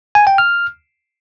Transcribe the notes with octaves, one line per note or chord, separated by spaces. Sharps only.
G#5
G5
F6